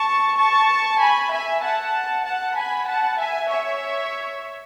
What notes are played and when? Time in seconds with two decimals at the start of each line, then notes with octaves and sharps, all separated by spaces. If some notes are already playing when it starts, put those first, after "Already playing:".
Already playing: A5 C#6
0.38 A5 C#6
1.00 G#5 B5
1.32 E5 G#5
1.62 F#5 A5
2.25 F#5 A5
2.56 G#5 B5
2.87 F#5 A5
3.19 E5 G#5
3.50 C#5 E5